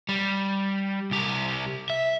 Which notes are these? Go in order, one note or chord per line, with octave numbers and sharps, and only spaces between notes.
G3
C2 G4
E5